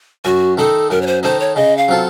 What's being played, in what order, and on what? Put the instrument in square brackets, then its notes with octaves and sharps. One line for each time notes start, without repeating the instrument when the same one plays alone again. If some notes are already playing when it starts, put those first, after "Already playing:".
[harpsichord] F#2 [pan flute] F#4
[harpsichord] D#3 A3 D#4 [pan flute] A4
[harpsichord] F#2 [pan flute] A#4
[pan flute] C#5
C5
[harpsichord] D#3 A3 D#4 [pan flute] C5
[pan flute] C#5
[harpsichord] C#3 [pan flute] D#5
[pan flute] F5
[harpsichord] F#3 C4 F4 A4